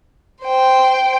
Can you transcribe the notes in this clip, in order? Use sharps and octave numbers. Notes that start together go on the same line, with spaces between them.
C5 G5